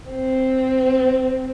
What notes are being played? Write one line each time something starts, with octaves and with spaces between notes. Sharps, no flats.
C4